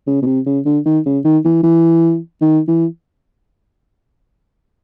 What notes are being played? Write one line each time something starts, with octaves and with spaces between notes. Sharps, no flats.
C#3
B2
C3
C#3
D3
D#3
C#3
D#3
E3
E3
D#3
E3